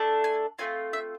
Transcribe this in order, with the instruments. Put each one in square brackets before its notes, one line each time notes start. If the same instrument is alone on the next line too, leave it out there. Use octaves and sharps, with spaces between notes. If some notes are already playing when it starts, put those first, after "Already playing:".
Already playing: [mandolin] A3 D4 A4
G#5
A3 C4 F4 G#5
E5